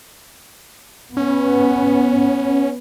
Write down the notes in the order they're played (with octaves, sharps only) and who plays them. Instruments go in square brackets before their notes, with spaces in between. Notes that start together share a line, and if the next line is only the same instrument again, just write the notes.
[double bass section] B3 [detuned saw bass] C#4